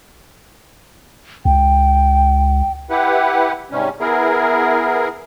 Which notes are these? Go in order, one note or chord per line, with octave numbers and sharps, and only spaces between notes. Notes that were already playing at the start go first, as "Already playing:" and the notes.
C#2 G5
E4 G4 B4 F#5
G#2 C3 G3 C#4
B3 E4 G#4 A#4